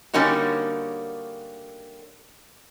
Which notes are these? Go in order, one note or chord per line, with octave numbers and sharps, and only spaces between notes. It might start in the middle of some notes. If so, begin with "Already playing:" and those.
D3 G3 A#3 C#4 D#4 F#4